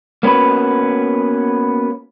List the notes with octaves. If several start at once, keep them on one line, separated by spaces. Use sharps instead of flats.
A#3 B3 C#4 F#4 B4